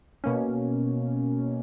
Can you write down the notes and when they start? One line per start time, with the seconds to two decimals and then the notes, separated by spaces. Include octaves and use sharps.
0.24 B2 A#3 C#4